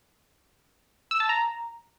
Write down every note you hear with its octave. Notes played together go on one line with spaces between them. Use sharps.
E6
A5
A#5